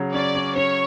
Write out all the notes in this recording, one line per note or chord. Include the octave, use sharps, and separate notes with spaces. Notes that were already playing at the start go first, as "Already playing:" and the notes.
Already playing: C#3 F#3
C#4 D5
C#4
C#4 C#5